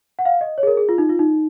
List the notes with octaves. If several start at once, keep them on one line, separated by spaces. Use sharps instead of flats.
F#5
F5
D#5
C#5
G#4
A#4
G#4
F4
D#4
F4
D#4